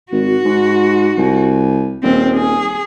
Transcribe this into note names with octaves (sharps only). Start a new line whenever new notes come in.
G#1 F#4
G#2
C2
D#1 C4
G#4